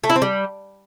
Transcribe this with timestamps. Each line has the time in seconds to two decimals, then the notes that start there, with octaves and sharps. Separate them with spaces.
0.04 A3
0.10 E4
0.16 C4
0.22 G3